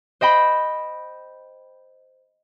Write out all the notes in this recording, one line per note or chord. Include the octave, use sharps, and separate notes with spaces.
C5 D#5 G5 B5